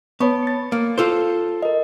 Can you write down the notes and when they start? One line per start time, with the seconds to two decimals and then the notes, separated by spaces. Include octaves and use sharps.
0.20 B3 C#5 A5 C#6
0.43 A6 C#7
0.72 A#3
0.98 F4 A4 C5
1.63 A#4 D#5